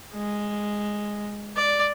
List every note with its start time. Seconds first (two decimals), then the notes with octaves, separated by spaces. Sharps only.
0.13 G#3
1.56 D5